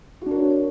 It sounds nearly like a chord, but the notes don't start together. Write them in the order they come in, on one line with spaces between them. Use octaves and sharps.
F#4 D4 A#4 C#5